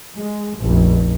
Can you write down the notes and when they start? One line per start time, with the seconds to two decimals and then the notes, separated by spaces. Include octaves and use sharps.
0.18 G#3
0.59 F1 A#1